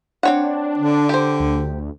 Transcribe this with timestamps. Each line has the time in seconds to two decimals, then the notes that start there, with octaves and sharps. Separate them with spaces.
0.23 C4 D4 C#5 F#5
0.78 D3
1.09 G4 C5
1.40 D2